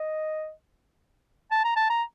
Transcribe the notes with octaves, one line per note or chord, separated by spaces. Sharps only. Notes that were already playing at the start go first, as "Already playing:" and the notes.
Already playing: D#5
A5
A#5
A5
A#5